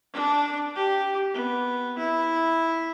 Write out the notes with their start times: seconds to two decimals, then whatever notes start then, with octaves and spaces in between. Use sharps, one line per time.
0.14 D4
0.76 G4
1.34 B3
1.98 E4